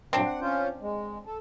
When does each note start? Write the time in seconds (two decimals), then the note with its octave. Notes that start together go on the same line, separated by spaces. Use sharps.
0.13 G2 A#2 F#3 C4 D4
0.26 F#5
0.41 C#4 F4 C5
0.81 G#3
1.26 A4